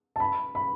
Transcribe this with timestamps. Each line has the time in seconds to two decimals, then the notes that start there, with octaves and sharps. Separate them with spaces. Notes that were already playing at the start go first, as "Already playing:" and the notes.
0.16 A5
0.20 B5
0.55 B5